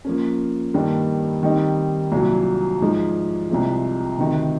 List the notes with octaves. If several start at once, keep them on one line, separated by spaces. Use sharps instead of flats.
F3 A#3 C#4
G2 D#3 G3 A#3 D4
D#3 G3 C4 D#4
C2 A#2 F#3
G#2 F3 G#3
C2 C3 F3 G#3
D2 C3 D#3